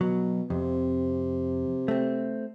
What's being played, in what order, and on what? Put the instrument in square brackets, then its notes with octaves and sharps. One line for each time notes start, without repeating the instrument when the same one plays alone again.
[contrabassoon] B2 [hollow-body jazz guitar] F#3
[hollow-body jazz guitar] F2 [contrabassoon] C3
[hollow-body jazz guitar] A3 C4